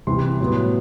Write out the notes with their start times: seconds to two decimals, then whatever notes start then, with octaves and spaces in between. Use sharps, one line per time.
0.07 C3 E3 G3 C4 C6
0.41 A2 F#3 B3